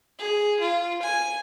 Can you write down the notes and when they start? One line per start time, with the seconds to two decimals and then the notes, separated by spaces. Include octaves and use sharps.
0.19 G#4
0.60 F4
1.02 G#5